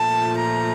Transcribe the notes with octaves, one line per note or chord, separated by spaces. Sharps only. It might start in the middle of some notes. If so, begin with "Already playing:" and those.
Already playing: A#2 F3 A3 A5
A#5